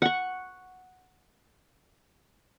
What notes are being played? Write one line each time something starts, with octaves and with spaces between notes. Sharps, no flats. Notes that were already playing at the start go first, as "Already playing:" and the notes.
F#5 C#6